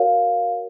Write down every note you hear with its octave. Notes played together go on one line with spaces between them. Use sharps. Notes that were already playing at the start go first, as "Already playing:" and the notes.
Already playing: F#4 A#4 C#5 F5